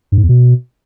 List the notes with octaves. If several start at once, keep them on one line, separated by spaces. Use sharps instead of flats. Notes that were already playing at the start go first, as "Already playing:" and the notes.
G2
G#2
E2
B2